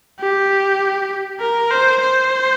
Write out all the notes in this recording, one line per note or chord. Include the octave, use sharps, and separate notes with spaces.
G4
A#4
C5
C5